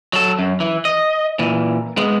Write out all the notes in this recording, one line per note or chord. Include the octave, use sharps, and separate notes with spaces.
F#3 A4
F#2
E3
D#5
A#2 E3
G#3 B3